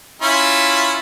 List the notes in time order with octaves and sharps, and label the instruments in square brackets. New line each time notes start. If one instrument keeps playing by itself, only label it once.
[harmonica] C#4 E4 F4